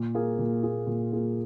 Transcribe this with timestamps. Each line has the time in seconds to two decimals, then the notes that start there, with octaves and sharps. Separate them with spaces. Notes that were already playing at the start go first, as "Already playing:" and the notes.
Already playing: A#2
0.14 A#3 F4 G#4
0.39 A#2
0.63 A#3 F4 G#4
0.87 A#2
1.12 A#3 F4 G#4